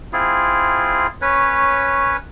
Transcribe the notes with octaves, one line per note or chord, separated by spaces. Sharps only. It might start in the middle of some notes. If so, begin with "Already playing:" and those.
C4 E4 F4 G#4
C#4 B4 C#5